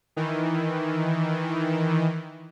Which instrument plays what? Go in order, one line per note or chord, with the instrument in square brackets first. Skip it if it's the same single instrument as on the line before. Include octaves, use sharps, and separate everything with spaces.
[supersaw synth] D#3 E3